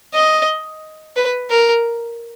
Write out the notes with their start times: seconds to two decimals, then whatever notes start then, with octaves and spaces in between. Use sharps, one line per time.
0.14 D#5
1.17 B4
1.50 A#4